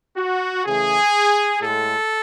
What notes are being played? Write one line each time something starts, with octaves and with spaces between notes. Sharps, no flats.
F#4
C#3 E3 A3 G#4
A2 G#3 A4